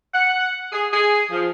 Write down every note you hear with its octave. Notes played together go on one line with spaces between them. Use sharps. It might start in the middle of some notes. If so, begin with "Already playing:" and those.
F#5
G#4
G#4
F3